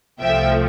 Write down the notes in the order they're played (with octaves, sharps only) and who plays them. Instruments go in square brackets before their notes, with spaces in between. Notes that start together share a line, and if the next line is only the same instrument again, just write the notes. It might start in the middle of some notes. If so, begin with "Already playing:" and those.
[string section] C2 C3 F3 A3 E5 G5